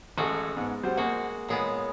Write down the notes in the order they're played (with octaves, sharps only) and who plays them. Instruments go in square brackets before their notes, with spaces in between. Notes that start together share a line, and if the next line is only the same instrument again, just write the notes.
[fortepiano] A1 A4 [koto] G#3 F#4
[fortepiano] G#2 [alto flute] B3
[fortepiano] F#3 G3 C5 [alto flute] F#5
[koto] G#3 F#4 [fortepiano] A#3
[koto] A#2 G#3 B3 [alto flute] C#5